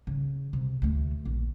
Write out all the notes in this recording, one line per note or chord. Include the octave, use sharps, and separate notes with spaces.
C#3
C3
D2 A3
A#1